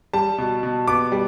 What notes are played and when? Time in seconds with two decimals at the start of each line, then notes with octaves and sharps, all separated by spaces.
0.13 G3 A5
0.38 B2
0.63 B2
0.88 B3 D6
1.12 G3